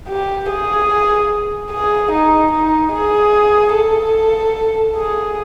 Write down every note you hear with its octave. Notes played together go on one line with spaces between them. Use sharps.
G4
G#4
G#4
D#4
D#4
G#4
A4
G#4